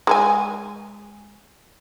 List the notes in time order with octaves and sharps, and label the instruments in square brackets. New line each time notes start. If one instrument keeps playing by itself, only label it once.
[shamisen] G#3 A4 G#5